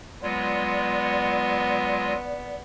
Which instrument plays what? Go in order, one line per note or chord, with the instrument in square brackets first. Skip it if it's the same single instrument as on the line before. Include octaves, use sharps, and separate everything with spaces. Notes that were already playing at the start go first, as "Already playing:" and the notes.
[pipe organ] F#3 G#3 F4 [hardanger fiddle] B3 [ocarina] D5